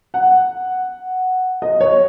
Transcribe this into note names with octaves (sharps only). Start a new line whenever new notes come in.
F#5
D#5
C#5